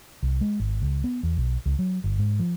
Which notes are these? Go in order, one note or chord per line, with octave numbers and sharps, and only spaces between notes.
C2
G#3
G#1
C#2
B3
E2
B1
C#2
F#3
G1
G#2
F3